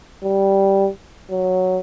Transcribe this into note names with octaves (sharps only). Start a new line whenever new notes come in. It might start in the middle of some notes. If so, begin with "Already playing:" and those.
G3
F#3